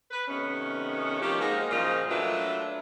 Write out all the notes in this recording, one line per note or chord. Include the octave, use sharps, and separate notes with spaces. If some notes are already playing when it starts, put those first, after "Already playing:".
B4
C3 D#3 A3 B3 C#4
D#3 F3 C#4 G4
G#3 A#3 C4 D#4 F#4 G#4
F#2 A#2 C#3 F3 D#5
F#3 A3 A#3 D4 F4 B4